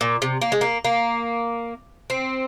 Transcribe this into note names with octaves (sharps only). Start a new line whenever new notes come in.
A#2
C3
A#3
G#3
A#3
A#3
C4